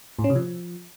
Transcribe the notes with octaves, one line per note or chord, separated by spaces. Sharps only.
A2
C#4
C3
F3